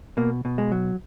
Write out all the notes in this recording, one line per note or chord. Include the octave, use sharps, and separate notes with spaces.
B2 A#3
B2
G#3
F#3